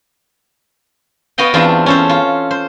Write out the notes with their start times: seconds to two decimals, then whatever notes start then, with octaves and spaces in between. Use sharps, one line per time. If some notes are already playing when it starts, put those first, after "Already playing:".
1.38 B3 F#4 D#5 F5 G5
1.54 E2 C4 D4 F4
1.86 C#4 A4 C5
2.09 F4
2.51 C5